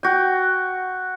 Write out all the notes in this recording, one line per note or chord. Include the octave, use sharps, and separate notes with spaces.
F#4 G5